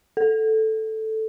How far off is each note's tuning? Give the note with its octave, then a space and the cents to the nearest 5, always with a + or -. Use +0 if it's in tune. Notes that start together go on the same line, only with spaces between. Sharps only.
A4 +0